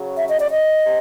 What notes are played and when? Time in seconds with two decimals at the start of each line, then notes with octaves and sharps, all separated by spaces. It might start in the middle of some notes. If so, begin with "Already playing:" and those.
Already playing: C#3 F#3
0.17 E5
0.29 D#5
0.40 D5
0.51 D#5
0.85 C3